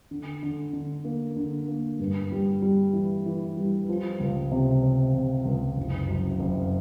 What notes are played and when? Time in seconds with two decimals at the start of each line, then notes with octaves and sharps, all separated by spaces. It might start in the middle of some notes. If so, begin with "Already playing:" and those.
0.11 D3
0.43 D3
0.73 D3
1.05 A#3
1.36 D3
1.68 A#3
2.00 G2
2.32 G3
2.62 G3
2.93 E3
3.26 E3
3.57 G3
3.89 F3
4.19 C#2
4.51 C3
4.83 C3
5.14 C3
5.45 C#2
5.78 F#1
6.08 F#2
6.39 F#1